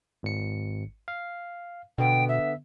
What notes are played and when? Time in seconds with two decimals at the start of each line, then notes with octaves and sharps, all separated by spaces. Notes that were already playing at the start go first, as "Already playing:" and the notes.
0.23 G#1 C#7
1.08 F5
1.98 B2 D3 B3 G5
2.28 E5